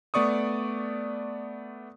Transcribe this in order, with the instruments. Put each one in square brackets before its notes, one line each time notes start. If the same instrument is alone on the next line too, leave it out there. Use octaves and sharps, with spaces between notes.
[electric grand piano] A3 B3 D5 C#6 D#6